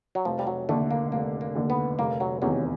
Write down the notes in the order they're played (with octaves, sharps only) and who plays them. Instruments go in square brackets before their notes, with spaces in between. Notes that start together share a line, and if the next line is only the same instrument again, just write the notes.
[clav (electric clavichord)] F#3
[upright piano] F1 [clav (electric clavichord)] F3
[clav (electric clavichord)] G3
F#3
[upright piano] D#2 D3 [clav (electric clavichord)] A3
[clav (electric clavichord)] A#3
[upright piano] F1 [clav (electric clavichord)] A#3
[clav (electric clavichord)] A#3
[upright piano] D#2 D3
[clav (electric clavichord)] B3
[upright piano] F1 [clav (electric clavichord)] A#3
[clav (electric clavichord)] F#3
[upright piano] E2 C3 D#3 [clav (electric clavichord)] F#3